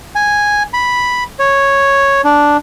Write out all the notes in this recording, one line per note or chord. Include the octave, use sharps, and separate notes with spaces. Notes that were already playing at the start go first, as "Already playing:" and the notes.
G#5
B5
C#5
D4